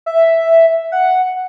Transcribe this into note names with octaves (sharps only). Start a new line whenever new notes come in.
E5
F#5